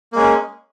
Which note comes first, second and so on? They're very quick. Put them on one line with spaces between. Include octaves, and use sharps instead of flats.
A#3 G#3 C#4